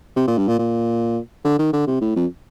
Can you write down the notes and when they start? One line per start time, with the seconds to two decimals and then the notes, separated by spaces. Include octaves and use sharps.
0.16 C3
0.28 A#2
0.38 G2
0.48 A#2
0.59 A#2
1.44 D3
1.59 D#3
1.73 D3
1.87 C3
2.01 A2
2.16 F2